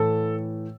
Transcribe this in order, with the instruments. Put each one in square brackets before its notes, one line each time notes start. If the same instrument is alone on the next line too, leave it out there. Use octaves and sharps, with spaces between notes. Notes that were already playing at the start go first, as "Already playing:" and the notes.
Already playing: [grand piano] A2 E3 A4